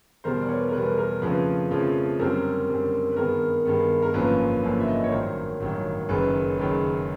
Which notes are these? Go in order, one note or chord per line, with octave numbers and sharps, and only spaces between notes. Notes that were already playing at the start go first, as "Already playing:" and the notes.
E2 B2 G3 A#4 C5
D5
B4 C#5
A#4
E2 B2 G3 B4
A#4
F2 C#3 F3 A3 B4
F2 C#3 F3 A3
F#2 D3 G3 C4 A#4 C5
F#2 D3 G3 C4
B4
G2 D#3 G#3 B3 A#4
G2 D#3 G#3 B3
A#4
G#1 F#2 D3 F3 A#3 B4
G#1 F#2 D3 F3 A#3
E5
D#5
D5
C#5
A1 G2 D#3 F#3 A#4 C5
A1 G2 D#3 F#3
F#1 F#2 D#3 G#3 B4
F#1 F#2 D#3 G#3